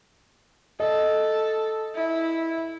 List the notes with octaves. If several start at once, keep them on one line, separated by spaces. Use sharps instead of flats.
A4 D#5
E4